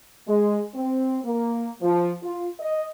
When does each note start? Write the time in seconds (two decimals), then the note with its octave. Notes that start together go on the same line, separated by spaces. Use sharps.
0.28 G#3
0.74 C4
1.24 A#3
1.82 F3
2.22 F4
2.60 D#5